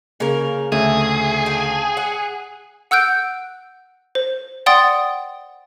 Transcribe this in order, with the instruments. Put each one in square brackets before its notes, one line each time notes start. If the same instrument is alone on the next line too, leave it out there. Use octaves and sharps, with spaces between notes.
[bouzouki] C#3 A#4 [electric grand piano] A#3
[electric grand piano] D2 C#3 A3 [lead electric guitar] G#4 [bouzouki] E5
[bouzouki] F5 G5 A5
F#5
[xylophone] F#5 E6 F#6 G6 D7
C5
D5 F#5 G5 C6 D#6 A6